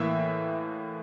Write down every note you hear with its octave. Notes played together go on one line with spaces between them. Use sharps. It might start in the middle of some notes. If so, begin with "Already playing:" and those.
Already playing: A2 E3 A#3 E5